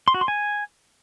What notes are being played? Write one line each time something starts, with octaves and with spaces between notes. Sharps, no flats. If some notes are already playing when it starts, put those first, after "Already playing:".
C6
F#4
C6
G#5